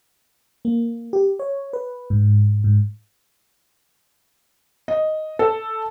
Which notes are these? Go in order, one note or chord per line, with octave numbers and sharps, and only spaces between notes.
A#3
G4
C#5
B4
G#2
G#2
D#5
A4